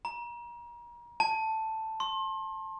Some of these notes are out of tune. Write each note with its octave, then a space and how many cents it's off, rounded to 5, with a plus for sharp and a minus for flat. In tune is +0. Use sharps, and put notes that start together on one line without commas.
A#5 +35
A5 +5
C6 +35